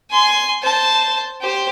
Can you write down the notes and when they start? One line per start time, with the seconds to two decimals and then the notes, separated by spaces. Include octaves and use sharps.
0.10 G#5 C6
0.62 C5 A5
1.41 G4 C5